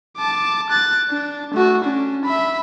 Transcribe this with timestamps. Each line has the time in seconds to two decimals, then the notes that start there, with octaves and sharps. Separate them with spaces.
0.17 A5 D6
0.70 F#6 A6
1.10 D4
1.54 A3 F#4
1.84 C#4 D4
2.25 E5 B5